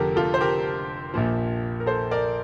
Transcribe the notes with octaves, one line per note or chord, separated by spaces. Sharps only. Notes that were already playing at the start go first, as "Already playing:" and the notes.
Already playing: F1 F2 D3 G4 A4 A#4
F4 A4
C5
G4 A#4
A#1 A#2 F3
A#4
A4 C5
A#4 D5